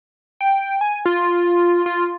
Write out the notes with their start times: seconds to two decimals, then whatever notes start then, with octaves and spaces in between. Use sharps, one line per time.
0.41 G5
0.81 G#5
1.06 F4
1.86 F4